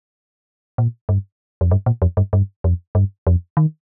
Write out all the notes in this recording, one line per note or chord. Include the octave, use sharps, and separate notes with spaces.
A#2
G2
F2
G2
A#2
F2
G2
G2
F2
G2
F2
D#3